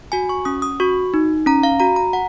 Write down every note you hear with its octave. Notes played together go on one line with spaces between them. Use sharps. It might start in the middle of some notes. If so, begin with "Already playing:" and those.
F#4 G#5
C#6
C#4 D#6
D#6
F#4 C#6
D#4
C#4 A#5
F5
F#4 A#5
A#5
F#5